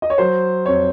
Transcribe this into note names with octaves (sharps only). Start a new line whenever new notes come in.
D#5
C#5
F#3 C5
F2 C#5